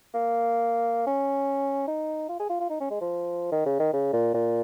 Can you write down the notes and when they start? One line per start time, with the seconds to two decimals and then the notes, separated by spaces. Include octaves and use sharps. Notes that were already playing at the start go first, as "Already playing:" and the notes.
0.14 A#3
1.07 C#4
1.88 D#4
2.29 F4
2.40 G#4
2.49 F4
2.60 F4
2.70 D#4
2.80 C#4
2.90 G#3
3.01 F3
3.52 D#3
3.66 C#3
3.79 D#3
3.93 C#3
4.13 A#2
4.34 A#2